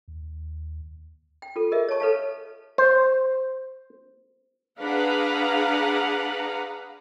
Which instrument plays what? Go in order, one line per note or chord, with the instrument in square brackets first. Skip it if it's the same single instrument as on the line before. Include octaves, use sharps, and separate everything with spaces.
[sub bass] D#2
[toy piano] G5
F4 A4
G#4 A#4 D#5 E5
C#5 D#5 A5 C#6
A4 B4 C#5 F5 A5
[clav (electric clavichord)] C5
[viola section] D4 G#4 B4 F5 F#5 A#5